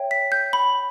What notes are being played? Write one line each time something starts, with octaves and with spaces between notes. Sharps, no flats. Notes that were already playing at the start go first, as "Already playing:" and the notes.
Already playing: C#5 E5 G5
B6
G6
B5